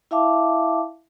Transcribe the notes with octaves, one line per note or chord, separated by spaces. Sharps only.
E4 E5 F5 A5 D6